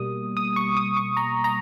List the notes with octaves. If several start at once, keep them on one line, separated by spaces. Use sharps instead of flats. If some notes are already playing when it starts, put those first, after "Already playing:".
Already playing: B2 G3 A#3 D#6
D#6
C#6
D#6
C#6
A#5
A#5